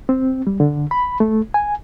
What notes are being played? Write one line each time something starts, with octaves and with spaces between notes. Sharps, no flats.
C4
G3
D3
B5
A3
G#5